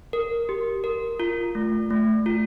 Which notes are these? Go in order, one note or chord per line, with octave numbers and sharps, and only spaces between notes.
A#4
G4
A#4
F4
A3
A3
F4